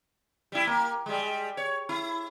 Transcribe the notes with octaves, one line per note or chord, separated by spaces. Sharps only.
G3 E4
A#3
G3 G#3
C#5
E4